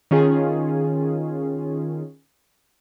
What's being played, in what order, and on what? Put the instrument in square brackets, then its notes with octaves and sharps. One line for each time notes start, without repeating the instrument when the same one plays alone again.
[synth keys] D#3 C#4 F4 G#4